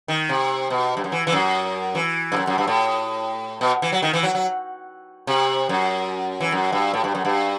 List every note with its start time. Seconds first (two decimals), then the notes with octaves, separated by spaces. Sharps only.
0.08 D#3
0.29 C3
0.70 B2
0.97 G2
1.04 F#2
1.12 E3
1.27 E3
1.32 F#2
1.95 E3
2.32 G2
2.36 F#2
2.47 F#2
2.58 G2
2.67 A2
3.61 B2
3.82 E3
3.92 F#3
4.02 D#3
4.13 E3
4.23 F#3
4.35 F#3
5.27 C3
5.69 F#2
6.41 E3
6.52 F#2
6.72 G2
6.94 A2
7.04 G2
7.15 F#2
7.25 G2